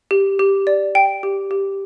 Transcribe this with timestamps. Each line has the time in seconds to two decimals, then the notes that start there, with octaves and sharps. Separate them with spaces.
0.11 G4
0.39 G4
0.67 D5
0.95 G5
1.23 G4
1.51 G4